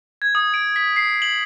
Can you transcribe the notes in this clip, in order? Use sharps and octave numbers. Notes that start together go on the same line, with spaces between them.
G#6
D#6
D7
B6
C7
F#7